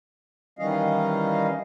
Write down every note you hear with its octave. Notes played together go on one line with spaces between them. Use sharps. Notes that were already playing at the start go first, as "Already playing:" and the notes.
D#3 E3 G3 C#4 D#5 F5